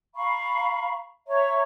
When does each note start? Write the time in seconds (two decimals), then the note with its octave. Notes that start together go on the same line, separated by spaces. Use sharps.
0.15 F5 A#5 B5 C#6
1.27 C#5 E5 A#5 C#6